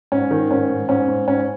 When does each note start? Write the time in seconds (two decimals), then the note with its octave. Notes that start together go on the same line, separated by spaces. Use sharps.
0.12 G#2 C#4
0.31 D#3
0.51 G#2 C#4
0.69 G#2
0.89 G#2 C#4
1.08 G#2
1.28 G#2 C#4